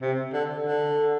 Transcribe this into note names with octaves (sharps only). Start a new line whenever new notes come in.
C3
D3
D3